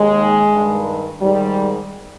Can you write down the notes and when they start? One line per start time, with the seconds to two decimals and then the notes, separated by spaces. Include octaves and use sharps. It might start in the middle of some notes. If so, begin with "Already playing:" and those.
Already playing: D#2 D#3 G#3
0.52 G2 D#3
1.22 G#2 D#3 G3